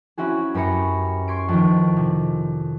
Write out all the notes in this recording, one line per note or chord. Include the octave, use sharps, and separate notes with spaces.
C4 C#4 E4 F#4 G#4
F#2 G4 B4 A#5 C#7
C6 C#6 G#6 B6 D7
F2 D#3
C3